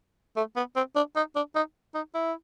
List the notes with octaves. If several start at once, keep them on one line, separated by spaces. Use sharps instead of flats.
A3
B3
C4
D4
D#4
D4
D#4
D#4
E4